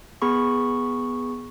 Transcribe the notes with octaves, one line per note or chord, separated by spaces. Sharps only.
B3 G#4 B5 C#6